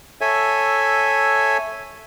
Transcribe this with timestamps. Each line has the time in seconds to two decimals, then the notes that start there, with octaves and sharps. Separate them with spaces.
0.21 A4 C#5 E5 G#5